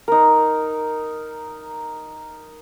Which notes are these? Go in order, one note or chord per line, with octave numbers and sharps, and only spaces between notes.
D#4 A#4